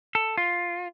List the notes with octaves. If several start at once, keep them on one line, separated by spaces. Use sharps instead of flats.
A4
F4